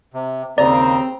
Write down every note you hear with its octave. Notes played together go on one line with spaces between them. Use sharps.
C3
D#2 C#3 C4 D5 A#5